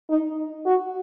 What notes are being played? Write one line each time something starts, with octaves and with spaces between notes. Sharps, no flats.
D#4
F#4